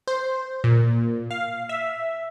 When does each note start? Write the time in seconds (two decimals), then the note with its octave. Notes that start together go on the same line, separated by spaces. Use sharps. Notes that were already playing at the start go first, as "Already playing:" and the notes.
0.07 C5
0.64 A#2
1.31 F5
1.69 E5